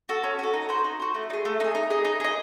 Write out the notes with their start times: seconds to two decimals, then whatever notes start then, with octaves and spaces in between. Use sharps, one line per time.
0.09 F#4 A4
0.24 C#4
0.39 F#4 A4
0.53 D#4
0.69 F#4 C5
0.84 D#4
1.00 F#4 C5
1.14 A3
1.30 D#4
1.33 G#4
1.45 A3
1.60 D#4
1.64 G#4
1.75 D#4
1.90 G#4 D#5
2.05 D#4
2.20 G#4 D#5